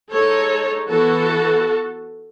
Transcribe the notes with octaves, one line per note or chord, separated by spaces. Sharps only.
G#3 D#4 A4 C#5
E3 B3 E4 F#4 A4